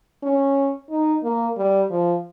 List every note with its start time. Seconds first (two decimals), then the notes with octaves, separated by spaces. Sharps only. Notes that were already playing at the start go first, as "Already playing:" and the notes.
0.23 C#4
0.90 D#4
1.23 A#3
1.57 G3
1.91 F3